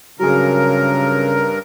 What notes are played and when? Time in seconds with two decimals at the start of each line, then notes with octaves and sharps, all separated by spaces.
0.19 G2 C#3 F#3 G#4 A#4